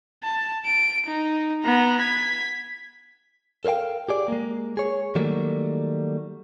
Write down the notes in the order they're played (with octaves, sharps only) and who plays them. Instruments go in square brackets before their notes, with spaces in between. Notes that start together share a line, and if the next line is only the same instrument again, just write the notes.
[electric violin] A5
D7
D#4
B3 A#5
G#6 B6
[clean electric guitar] A4 A#4 C5 F5 G5
G4 G#4 D5
G#3 A#3
G#4 C#5
D#3 F#3 G3 A3 A#3